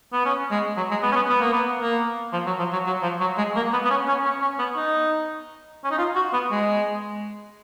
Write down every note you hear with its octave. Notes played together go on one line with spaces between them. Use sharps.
B3
C#4
G#3
F#3
G#3
B3
C#4
B3
B3
A#3
B3
A#3
F3
F#3
F3
F#3
F#3
F3
F#3
G#3
A#3
B3
B3
C#4
C#4
C#4
C#4
B3
D#4
C#4
D#4
F4
F#4
B3
G#3